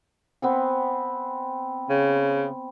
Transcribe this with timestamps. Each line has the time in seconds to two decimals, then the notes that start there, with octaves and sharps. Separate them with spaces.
0.42 B3 C4 G#5
1.90 C#3